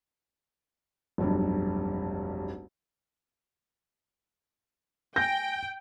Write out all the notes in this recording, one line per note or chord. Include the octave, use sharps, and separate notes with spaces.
F1 B1 G2
G5 G#5 G6 A#6